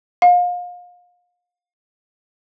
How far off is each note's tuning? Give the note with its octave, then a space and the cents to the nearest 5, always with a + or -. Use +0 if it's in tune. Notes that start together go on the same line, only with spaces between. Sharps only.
F5 +30